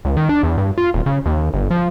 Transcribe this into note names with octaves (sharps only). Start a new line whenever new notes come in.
C#2
D#3
D4
E2
G2
F4
D#1
C#3
D#2
G1
F3